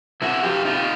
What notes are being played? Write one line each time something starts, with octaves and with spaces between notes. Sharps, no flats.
C3 E4 F#4
F3 F4 G4
C3 D#4 F4